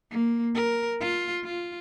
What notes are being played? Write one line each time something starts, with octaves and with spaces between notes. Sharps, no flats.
A#3
A#4
F4
F4